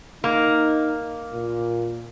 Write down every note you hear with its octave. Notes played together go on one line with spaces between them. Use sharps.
A#3 D#4
A#2